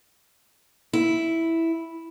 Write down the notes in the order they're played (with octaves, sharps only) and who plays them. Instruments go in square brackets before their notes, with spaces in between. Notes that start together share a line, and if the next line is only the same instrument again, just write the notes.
[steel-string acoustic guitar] E4